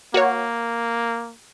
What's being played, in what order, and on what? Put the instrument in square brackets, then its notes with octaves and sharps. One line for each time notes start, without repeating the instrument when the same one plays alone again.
[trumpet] A#3 [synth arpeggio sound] F#4 A#4 C#5